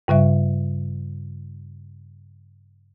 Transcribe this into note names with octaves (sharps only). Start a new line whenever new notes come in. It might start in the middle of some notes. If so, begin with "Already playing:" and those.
G2 C#3 G3 E5